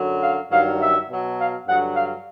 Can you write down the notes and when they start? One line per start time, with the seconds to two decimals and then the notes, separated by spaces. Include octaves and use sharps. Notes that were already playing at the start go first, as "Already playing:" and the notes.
Already playing: F#2 D3 F#3
0.21 F5
0.50 G2 D#3 F#3 F5
0.80 E5
1.09 B2 F#3
1.38 F5
1.67 G2 D3 F#3 F#5
1.95 F5